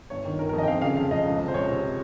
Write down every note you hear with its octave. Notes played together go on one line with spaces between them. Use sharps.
G1 C#5
D#3
G1 A#4
F2 A#4
D#5 G5
C4 F5
C#3 F5
F2 F5
F2 D#5
C#2
F3
C5
C#2 C#5
C3